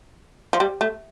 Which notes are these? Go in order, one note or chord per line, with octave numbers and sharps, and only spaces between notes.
F3
G3
A3